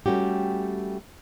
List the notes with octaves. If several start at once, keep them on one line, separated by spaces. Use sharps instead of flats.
G3 A3 C#4 F#4 G4